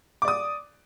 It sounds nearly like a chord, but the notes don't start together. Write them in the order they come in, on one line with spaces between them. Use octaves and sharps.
D6 D5 D#6